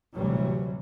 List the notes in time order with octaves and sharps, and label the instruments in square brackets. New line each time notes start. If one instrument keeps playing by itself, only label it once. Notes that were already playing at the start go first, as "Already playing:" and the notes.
[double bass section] A1 D2 C3 E3 F#3 G3